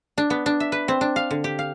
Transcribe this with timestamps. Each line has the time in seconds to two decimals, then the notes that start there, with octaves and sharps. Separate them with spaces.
0.18 D4
0.30 B3
0.46 D4
0.60 E5
0.72 B4
0.88 C4
1.01 D4
1.16 F5
1.31 D3
1.44 G4
1.59 F5